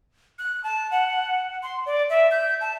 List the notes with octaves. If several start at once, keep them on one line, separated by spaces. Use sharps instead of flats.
F#6
A5
F#5
C6
D5
E5
G6
A5